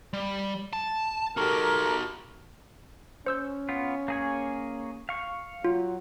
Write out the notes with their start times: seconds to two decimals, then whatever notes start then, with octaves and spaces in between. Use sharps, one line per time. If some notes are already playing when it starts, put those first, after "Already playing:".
0.13 G3
0.73 A5
1.37 D#4 F#4 G4 A4 A#4
3.26 C#4 C5 E6 G6
3.69 B3 F4
4.08 A#3 G#4 C#5
5.09 F5 C#6
5.64 F#3 F4